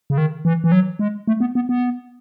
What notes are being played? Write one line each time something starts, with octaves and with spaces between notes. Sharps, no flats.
C#3
D#3
E3
E3
F#3
G#3
A3
B3
B3
B3